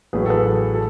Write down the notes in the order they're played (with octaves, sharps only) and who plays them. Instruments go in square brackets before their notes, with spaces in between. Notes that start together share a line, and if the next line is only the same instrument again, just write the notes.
[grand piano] A1 A2 F#3 G#4 B4
A4
G#4 B4
A4
A4